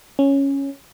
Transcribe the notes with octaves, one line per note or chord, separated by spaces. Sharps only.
C#4